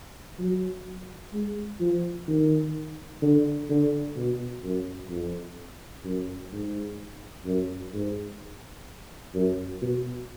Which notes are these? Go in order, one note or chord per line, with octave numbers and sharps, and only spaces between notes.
F#3
G#3
F3
D#3
D3
D3
B2
F#2
F2
F#2
G#2
F#2
G#2
F#2
B2